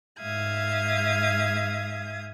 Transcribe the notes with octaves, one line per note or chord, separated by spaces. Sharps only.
G#2 E5 F5 D#6 G#6